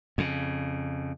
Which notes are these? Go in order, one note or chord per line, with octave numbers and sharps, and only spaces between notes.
F2 C#3